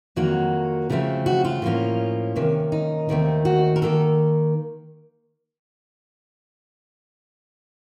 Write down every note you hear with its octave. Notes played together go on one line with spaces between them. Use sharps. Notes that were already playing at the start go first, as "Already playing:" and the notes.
F2 D#3 F#3 A#3 F#4
C#3 F3 A3 C4
F#4
F4
A2 F3 A#3 C#4
C3 D#3 A#3 C#4
D#4
D#2 D#3 A3 C4
F#4
A#4
D#3 A#3 A4